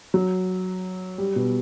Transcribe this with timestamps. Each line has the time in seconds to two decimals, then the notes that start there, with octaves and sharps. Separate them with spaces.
0.14 F#3
1.18 G3
1.36 B2